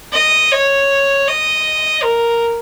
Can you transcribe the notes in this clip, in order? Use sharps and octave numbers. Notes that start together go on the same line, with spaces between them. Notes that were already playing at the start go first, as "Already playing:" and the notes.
D#5
C#5
D#5
A#4